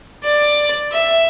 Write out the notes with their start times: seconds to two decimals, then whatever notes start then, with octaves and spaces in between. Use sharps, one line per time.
0.24 D5
0.92 E5